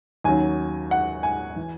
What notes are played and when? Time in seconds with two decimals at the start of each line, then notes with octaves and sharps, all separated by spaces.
0.24 D#2 D#3 F#3 C#4 G#5
0.91 F#5
1.23 G#5
1.56 E3